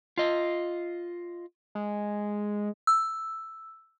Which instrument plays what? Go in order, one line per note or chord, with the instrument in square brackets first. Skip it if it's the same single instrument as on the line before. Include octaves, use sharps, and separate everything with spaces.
[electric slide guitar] F4 D#5
[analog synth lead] G#3
[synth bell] E6